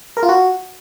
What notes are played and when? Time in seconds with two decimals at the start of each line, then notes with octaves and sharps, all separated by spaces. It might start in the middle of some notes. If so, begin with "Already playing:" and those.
0.17 A#4
0.23 F4
0.29 F#4